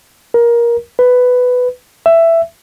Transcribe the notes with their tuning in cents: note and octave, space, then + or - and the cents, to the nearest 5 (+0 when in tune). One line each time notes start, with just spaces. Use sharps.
A#4 +20
B4 +10
E5 +10